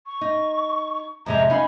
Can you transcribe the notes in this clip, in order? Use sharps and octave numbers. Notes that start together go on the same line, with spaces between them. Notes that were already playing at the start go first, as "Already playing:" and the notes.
C#6
D#4
F2 C3 G#3 A#5
C#4 D#4 F5 B5